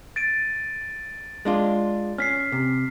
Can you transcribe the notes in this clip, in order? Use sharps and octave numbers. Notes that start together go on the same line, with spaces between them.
A6 D7 D#7
G#3 D4 F4
C#4 F6 B6 C7
C3